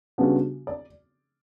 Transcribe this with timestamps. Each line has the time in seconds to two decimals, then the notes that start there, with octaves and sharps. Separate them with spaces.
0.18 C#3 G3 B3 D4 F#4
0.67 D5